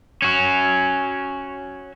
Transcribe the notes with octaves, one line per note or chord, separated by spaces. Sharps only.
C#4 F#4